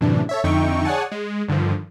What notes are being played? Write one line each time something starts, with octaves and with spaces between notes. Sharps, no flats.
F#2 A2 C3 E3 D4
A4 C#5 E5
F2 D3 D#4 E5 G5 C#6
G#4 C#5 D5 F#5 G#5 A5
G#3
G2 D3 D#3 F3